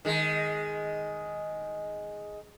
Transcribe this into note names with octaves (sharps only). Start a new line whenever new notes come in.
D#3 G#3